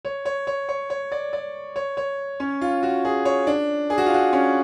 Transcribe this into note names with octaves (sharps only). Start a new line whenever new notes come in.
C#5
C#5
C#5
C#5
C#5
D5
D5
C#5
C#5
C#4
F4
F#4
G#4
C#5
D4
G#4
F#4
F4
F#4
C#4